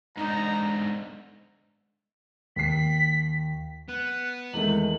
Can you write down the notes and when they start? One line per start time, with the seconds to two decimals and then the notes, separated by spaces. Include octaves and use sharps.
0.18 G#2 D3 D#4 A#5
2.56 D#2 B6 C7
3.89 B3 F#6
4.53 E2 D#3 G#3 A3 F#7